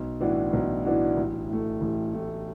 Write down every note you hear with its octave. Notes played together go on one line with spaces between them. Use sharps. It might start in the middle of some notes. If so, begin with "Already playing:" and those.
Already playing: B1
A2 E3 D4 F#4
B1
A2 E3 D4 F#4
A1
A2 A3
A1
A2 A3